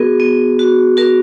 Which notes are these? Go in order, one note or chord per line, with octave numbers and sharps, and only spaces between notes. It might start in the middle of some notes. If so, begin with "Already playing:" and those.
Already playing: B3 F#4 G#4 A#4
B3
F#4
F#4 A#4